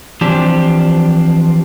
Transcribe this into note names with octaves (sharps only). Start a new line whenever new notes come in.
E3 F3 C4 D4 G4